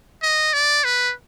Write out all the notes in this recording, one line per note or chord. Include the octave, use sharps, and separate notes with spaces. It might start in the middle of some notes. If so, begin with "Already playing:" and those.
D#5
D5
B4